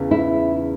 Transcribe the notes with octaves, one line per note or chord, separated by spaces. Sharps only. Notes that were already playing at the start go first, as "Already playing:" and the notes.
Already playing: E2 C#3 E3 B3
E4